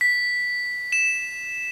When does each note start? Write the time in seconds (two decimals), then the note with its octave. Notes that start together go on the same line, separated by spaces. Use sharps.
0.01 B6
0.92 E7